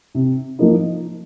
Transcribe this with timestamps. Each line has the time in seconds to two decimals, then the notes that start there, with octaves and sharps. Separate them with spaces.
0.15 C3
0.59 F3 A#3 D#4